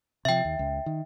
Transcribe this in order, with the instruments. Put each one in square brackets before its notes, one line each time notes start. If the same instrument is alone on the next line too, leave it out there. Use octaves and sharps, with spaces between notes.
[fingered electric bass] C3 F3 [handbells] E5 G5
[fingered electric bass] D#2
C#2
D#3